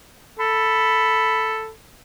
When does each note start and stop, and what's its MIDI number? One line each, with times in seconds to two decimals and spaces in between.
0.40 1.70 69
0.40 1.71 83